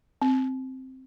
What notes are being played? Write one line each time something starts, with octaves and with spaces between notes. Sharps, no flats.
C4